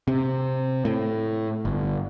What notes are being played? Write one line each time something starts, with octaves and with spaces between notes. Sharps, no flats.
C3
A2
G1